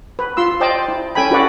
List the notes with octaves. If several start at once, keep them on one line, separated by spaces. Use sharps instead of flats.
B4
F4 C6 E6
C5 D5 D#5 G5 A5
E4
C#4 A4 G5 G#5 B5
E4 F#4 A4 B4 D5 F#5